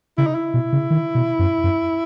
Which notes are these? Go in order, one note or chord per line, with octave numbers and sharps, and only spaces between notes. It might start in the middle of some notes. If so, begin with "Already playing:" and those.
C#3 E4
D#4
E4
B2
C#3
D#3
B2
F#2
F#2